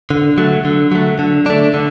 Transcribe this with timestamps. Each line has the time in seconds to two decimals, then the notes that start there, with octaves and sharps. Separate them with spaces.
0.10 D3
0.38 F#3 A3
0.65 D3
0.92 F#3 A3
1.19 D3
1.46 A3 D4
1.74 D3